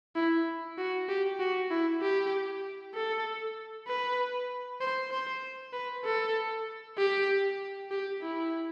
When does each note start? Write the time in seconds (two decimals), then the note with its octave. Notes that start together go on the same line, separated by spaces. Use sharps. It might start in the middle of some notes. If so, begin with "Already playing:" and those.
0.16 E4
0.78 F#4
1.09 G4
1.40 F#4
1.71 E4
2.01 G4
2.94 A4
3.87 B4
4.81 C5
5.11 C5
5.73 B4
6.04 A4
6.98 G4
7.91 G4
8.22 E4